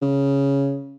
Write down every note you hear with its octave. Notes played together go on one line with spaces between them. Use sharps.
C#3